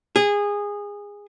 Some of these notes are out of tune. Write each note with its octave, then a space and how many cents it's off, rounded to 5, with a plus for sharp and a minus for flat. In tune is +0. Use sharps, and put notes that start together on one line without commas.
G#4 -20